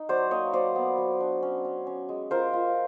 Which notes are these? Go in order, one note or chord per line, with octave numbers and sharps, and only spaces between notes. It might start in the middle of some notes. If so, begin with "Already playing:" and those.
Already playing: D#4
F#3 C5 D5
A#3 C#5 D#5
F#3 C5 D5
B3
F#3
D4
C#4
C#4
C#4
G#3
F4 A#4 C5
F4